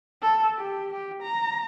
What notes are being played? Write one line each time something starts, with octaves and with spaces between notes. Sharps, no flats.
A4
G4
G4
A#5